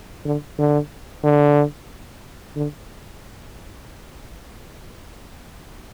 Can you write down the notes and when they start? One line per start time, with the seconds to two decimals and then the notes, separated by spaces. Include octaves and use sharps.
0.25 D3
0.58 D3
1.24 D3
2.56 D3